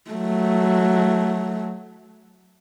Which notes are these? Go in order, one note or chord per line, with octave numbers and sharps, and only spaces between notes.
F#3 A3